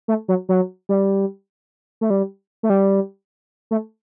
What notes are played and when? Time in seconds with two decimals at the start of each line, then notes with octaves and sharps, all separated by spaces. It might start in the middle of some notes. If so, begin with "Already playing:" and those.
0.08 A3
0.28 F#3
0.49 F#3
0.89 G3
2.01 A3
2.10 G3
2.63 A3
2.70 G3
3.71 A3